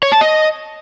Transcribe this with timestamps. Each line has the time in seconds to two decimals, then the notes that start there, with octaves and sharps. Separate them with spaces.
0.03 C#5
0.12 A5
0.21 D#5